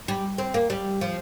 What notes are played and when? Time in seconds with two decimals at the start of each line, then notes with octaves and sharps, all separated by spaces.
0.08 G3
0.38 C4
0.54 A#3
0.70 G3
1.01 F3